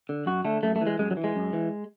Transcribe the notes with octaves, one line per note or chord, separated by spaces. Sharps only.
D3
F#2 F#4
D3 A3
F#2 A3
A3
E3
G#3
F#2 G#3
F#3
E3
G#3
F#2
E3